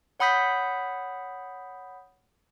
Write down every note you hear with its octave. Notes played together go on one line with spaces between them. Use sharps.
C#5 F#5 B5 D#6 G6 B6